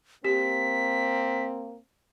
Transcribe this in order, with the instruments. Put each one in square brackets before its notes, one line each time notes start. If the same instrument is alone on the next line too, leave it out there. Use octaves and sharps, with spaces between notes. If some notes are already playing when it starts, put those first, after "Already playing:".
[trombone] A#3 [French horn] C4 [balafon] G4 [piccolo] B6